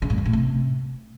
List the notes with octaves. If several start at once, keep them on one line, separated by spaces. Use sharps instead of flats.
C#3
G#2
F#2
A2
C3